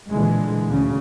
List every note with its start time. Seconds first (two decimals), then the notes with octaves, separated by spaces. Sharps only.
0.10 A#2 D3 E3 G#3
0.68 D2 C#3